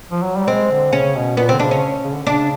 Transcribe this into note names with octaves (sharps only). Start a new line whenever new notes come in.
F3
F#3
G3
G#3 C4
D3
C#3 C#4
B2
A#2 B3
D3 C4
C#3 D4
C#4
C#3
D3
C#3 D4